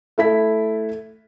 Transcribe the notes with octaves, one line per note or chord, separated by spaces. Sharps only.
A3 E4 B6